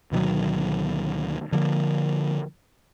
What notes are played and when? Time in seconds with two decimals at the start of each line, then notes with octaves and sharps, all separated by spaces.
0.11 D2 B2 D#3 F#3
1.52 D3 F3 G3 A#3